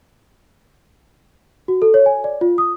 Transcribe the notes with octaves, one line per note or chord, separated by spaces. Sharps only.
F#4
A4
C#5
G#5
D5
F4
D#6